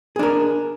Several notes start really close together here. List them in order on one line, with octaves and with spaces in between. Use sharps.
G#4 D4 A#4